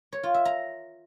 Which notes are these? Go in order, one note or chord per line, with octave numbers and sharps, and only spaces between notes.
C#5
F4
E5
A#5